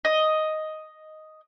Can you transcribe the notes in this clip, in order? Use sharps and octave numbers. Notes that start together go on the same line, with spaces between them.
D#5